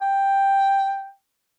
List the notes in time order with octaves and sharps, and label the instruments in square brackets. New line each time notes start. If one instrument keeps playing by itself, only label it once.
[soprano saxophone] G5